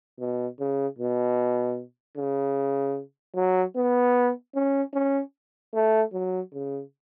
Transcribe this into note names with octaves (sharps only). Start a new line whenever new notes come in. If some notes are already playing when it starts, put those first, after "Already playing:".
B2
C#3
B2
C#3
F#3
B3
C#4
C#4
A3
F#3
C#3